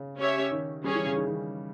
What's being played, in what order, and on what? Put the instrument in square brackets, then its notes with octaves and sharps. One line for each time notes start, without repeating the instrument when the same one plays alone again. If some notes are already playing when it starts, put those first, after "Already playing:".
Already playing: [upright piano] C#3
[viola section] C#4 G4 C#5 E5
[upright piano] D#3
[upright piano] G3 [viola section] C#4 G#4 C#5
[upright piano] E3
C#3
D#3
D#3